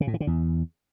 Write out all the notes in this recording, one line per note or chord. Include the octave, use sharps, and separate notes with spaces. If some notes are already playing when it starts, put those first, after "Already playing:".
C#3
A2
E3
D3
E2